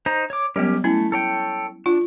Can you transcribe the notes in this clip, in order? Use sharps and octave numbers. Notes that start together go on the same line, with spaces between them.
D#4 C5 A#5
C#5 D6
F#3 G3 B3 C#4 G4 A#4
A3 C#4 E4
A4 C#5 G5
D4 F4